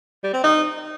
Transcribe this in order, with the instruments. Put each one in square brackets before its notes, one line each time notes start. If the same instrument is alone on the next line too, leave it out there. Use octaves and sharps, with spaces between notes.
[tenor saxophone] G3
C4
D#4